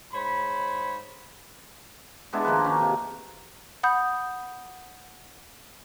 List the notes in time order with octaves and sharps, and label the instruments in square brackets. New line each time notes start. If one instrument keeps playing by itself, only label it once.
[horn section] G#2 C5 C#5 B5
[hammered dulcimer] G#3 B3 D4 E4
D#3 F3 A#3 B4
D#3 C#4 F#4
C3
[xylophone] F#5 B5 D#6 G6